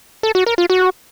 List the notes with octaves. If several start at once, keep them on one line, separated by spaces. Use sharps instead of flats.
A4
F#4
A#4
F4
F#4